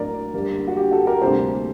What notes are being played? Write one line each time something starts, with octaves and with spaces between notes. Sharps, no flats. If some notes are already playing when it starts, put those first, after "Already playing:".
Already playing: A2 F#3 A#3 A#4 D5
F#2 D3 G3 A#3
F#4
G4
F#4 A4
G4 A#4
D2 C3 G3 A#3 A4 C5